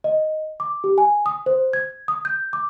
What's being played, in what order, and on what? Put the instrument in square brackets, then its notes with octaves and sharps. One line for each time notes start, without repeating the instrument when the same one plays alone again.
[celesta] D#5
D6
G4
G#5
D#6
C5
G#6
D#6
G6
D6